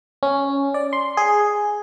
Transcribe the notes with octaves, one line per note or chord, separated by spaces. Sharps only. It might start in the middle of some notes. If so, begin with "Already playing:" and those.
C#4
D5
C6
G#4